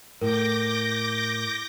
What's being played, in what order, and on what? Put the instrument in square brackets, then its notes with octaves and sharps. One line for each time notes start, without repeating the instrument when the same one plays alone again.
[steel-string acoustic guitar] A2 [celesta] A#4 [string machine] D6 G6 A#6